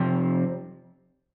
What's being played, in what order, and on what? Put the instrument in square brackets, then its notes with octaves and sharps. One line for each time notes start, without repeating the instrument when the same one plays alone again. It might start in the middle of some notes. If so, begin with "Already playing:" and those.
Already playing: [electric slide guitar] F2 C3 F3